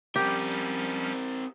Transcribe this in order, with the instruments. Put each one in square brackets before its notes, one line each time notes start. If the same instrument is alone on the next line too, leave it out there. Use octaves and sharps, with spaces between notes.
[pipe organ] F3 G3 C#4 [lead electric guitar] C4 A#4 [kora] G4